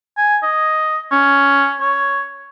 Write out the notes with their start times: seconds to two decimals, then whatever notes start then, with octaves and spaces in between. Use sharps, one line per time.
0.18 G#5
0.43 D#5
1.12 C#4
1.81 C#5